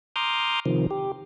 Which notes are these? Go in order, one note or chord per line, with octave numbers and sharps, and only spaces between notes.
A#5 C6 D6 D#6 F6 G6
C3 D#3 F3
G4